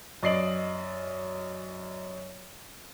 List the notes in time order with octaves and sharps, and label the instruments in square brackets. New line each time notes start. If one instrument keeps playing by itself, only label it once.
[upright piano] F#2 D5 D#5 C7 D7 F#7